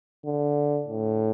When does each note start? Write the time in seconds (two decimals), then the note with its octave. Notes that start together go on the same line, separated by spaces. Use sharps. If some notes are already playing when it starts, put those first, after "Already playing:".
0.25 D3
0.87 A2